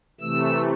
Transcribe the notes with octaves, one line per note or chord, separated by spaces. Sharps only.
C3 E3 A3 E6